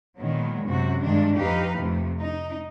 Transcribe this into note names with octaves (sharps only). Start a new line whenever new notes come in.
A#2 D#3 F#3 G#3 B3
F#2 C3 F#4
G2 D#3 G#3 D4
F2 F3 D#4 G4 B4 F5
F2 C3 F3 A3
D#4